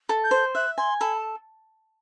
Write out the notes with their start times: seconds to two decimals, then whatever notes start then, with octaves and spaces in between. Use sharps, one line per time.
0.09 A4
0.24 G6
0.31 C5
0.55 E5 F#6
0.78 G#5 C6
1.00 A4 B5
1.17 A5